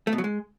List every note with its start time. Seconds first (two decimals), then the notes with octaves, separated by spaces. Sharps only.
0.07 A3
0.13 B2
0.18 F#3
0.24 G#3